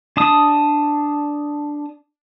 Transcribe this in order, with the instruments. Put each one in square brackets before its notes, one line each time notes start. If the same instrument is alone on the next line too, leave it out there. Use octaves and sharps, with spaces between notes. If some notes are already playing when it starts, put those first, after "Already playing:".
[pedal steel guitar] D4 A5 D#6